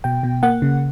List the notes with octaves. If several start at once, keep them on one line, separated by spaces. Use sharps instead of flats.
B2 G5
B2
A#3 F#5
C#3